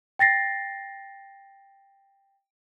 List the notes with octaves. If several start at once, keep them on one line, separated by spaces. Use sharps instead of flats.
G5 A6 A#6 C7